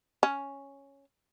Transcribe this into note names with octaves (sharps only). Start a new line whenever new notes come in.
C#4